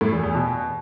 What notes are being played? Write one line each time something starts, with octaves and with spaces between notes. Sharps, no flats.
A2
E2
E2
B2